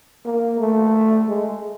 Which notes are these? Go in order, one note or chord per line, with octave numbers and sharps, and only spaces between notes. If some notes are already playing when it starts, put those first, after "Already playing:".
A#3
A3
G#3